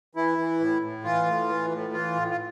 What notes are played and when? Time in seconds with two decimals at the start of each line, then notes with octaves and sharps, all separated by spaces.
0.15 E3 E4
0.38 E3
0.59 A2
0.82 A2
1.04 E3 F4
1.26 A2
1.48 E3
1.71 A2
1.93 E3 F4
2.15 A2
2.30 F4